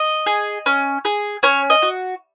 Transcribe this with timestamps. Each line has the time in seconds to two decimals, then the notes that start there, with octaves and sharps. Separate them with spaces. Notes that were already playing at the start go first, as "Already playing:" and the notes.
Already playing: D#5
0.26 G#4
0.66 C#4
1.05 G#4
1.43 C#4 C#5
1.70 D#5
1.82 F#4